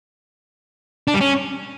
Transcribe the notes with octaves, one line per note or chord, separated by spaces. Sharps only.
D4
G3
C#4